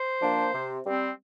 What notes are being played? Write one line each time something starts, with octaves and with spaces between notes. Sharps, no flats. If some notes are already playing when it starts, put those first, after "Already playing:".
Already playing: C5
F3 A#3 D4
C3
G3 C4